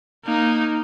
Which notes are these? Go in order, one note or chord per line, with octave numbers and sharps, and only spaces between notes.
A#3 D#4